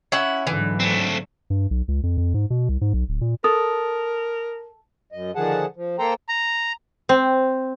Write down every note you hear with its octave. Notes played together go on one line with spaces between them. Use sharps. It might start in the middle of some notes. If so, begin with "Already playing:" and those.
C#4 E4 F#5
G#2 D3 E3 F#3
A3 C4
G2
B1
C#2
F2
F2
G#2
B2
C2
G#2
B1
D1
A#2
A4 A#4 D#6
F#2 D#5
D3 D#3 F3 G#4 F#5 A5
F3
A#3 A4 C5 G5 A#5
A#5
C4